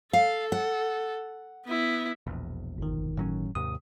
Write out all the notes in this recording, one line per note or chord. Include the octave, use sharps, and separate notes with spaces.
A4 F5
F#5
B3 E4
E1 A#1 E2
G1 D#3
A2 F#3 C#4
D#2 G#2 C3 D#6